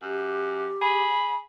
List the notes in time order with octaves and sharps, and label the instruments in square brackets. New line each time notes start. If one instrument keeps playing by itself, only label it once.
[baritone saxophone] F#2 [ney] G4
[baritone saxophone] G#4 [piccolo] B5